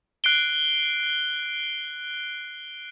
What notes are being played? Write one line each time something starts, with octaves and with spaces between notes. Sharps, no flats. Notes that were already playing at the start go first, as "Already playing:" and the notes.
F#6 C7 D7 G7